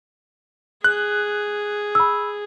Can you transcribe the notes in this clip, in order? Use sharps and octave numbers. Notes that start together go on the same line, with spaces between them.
G#4 F#6
B5 E6